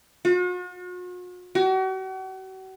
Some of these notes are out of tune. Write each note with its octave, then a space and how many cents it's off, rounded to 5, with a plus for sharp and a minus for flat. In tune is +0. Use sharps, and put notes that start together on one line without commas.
F#4 -45
F#4 +40